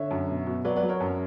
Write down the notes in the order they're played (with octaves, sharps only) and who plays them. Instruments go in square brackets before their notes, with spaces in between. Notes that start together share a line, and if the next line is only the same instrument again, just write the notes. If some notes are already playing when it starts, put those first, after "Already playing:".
Already playing: [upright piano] D3 C#5 E5
F#2
B2
B2
F#3 B4 D5
B4 D5
F#3
A#4 C#5
F#2